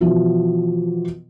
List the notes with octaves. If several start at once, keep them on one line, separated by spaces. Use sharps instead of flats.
B2 E3 F3 F#4